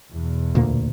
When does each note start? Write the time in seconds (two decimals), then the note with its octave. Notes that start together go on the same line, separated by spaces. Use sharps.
0.12 E2 B2
0.55 D2 A#2 A#3